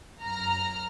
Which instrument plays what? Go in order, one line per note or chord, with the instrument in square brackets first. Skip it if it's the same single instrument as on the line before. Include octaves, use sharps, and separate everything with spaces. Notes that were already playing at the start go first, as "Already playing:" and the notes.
[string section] F#2 A#5 F6